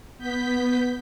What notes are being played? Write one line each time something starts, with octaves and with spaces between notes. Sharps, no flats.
B3 G6 B6